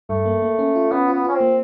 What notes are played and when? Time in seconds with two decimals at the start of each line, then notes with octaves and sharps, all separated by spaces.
0.09 G2 A3
0.26 A#3
0.42 A#3
0.59 C#4
0.75 F4
0.91 B3 C#4
1.08 F4
1.13 B3
1.24 C#4 F4
1.35 C4
1.40 A#3